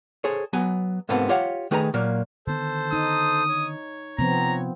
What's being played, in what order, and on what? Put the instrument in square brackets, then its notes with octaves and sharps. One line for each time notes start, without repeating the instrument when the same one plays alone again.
[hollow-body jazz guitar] G#4 A4 C5 C#5
F#3 B3 G#5
G#2 C3 A#3 B3 A4 C5
F4 G4 C#5 F5 F#5
D#3 A3 G#4 B4 G5 A#5
A#2 F#3 A#3
[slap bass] D3 D#3 B3 [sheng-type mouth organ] A4 C5
[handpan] D#4 [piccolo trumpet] D#6
[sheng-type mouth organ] C#5
[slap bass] C3 [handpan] F3 B3 C4 [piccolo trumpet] A#5